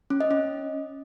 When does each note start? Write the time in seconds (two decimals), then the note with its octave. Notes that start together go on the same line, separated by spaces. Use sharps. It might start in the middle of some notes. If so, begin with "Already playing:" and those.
0.10 C#4
0.20 D#5
0.31 C#4